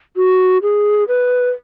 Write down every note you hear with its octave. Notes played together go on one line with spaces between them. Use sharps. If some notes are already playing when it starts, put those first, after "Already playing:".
F#4
G#4
B4